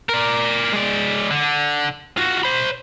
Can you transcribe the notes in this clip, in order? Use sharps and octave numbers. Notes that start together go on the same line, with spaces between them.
A#4 D5
G#3 D5
D3
F4 F#4
C5 B5